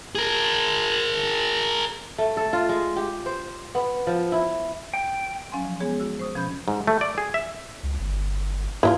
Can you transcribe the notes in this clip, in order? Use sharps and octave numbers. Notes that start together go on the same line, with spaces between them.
G#4 A#4
A3
A4
F4
G#3
G4
C5
B3
F3
E4
G5
F#3 C#4 F5 G#5 C6
F3
G#3 B3 G#4 C#5
F#4 E6
C5 C#6 D#6
B2 F3 C#4 B5 G6
G#2
A3
D5
G#4
E5
C#2
G1
G#2 E3 D#4 F4